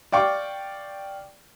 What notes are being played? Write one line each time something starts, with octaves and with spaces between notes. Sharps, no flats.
D5 F5 G5 C#6 D6